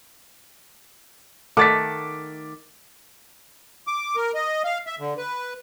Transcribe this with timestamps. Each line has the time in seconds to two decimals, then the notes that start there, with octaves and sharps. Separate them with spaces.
1.57 D#3 A3 F#5 D6 A6 B6
3.87 D6
4.16 A#4
4.35 D#5
4.64 F5
4.87 E5
4.99 D3
5.17 B4